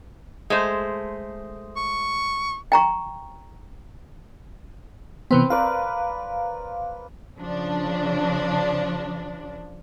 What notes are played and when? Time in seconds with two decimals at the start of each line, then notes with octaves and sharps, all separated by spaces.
0.50 G#3 A3 C5
1.76 C#6
2.72 G5 A#5 C#6
5.31 C3 E3 B3 C4 B4
5.50 A#4 B4 D5 F5
7.39 C#3 F3 D4